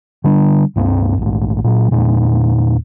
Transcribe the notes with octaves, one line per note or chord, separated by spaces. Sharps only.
D3 G3 D4
C#2 G2 A3 C4
A#1 G#2
A#2 F#3
E2 A#2 G#3 D4